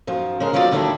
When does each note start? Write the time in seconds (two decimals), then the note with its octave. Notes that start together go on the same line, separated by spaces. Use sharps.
0.07 F#2 D#3 F3
0.40 C#3 G#3 A#4
0.53 D#3 F3 F#3 F4 A4 D5
0.71 D2 D3 D#3 G3 D4 E4